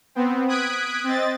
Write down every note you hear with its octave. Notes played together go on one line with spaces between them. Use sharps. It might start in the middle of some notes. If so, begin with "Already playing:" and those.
B3 C4
D#6 F#6 G#6 B6 D7
C4 D#5 A6